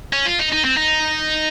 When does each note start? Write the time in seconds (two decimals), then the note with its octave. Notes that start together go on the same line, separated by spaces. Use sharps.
0.13 C#4
0.25 F4
0.39 D#4
0.52 D#4
0.64 C4
0.77 D#4